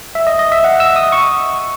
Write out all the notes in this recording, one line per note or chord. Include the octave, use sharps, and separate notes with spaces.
E5
D#5
D#5
E5
F#5
E6
D#6
C#6